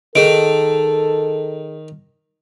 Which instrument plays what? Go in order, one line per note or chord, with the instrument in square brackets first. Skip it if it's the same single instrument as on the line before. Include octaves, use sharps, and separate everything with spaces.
[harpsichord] D#3 [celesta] G#4 D7 [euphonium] A4